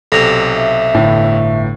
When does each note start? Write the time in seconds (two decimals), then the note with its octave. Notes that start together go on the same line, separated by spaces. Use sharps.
0.12 B1 C3 A4 A#6 F7
0.54 E5
0.94 G1 A2